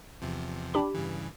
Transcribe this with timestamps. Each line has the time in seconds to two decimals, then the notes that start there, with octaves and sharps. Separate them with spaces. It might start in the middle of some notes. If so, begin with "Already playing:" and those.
0.22 E2 C3 F3
0.74 D4 G4 B5
0.94 G2 C#3 E3